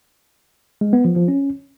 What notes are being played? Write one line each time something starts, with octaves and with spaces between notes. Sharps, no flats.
G#3
B3
F3
F3
C#4